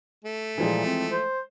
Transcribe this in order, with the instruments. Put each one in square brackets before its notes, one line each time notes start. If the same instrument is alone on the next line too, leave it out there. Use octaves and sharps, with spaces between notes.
[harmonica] A3
[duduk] A#2 [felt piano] E3 F3 G#3
[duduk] C4
C5